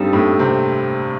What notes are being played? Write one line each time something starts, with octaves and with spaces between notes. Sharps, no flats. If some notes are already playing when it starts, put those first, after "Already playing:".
Already playing: G2 G3 C4 D#4 A4
A2 A3
C3 C4